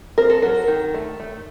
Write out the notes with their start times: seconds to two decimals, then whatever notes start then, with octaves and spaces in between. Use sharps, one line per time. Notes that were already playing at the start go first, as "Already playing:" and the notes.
0.18 C4 A#4
0.30 A4
0.42 F#3 A#4
0.68 D#3
0.94 A3
1.20 A3